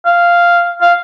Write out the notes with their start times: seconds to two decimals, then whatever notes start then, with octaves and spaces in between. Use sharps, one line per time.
0.06 F5
0.81 F5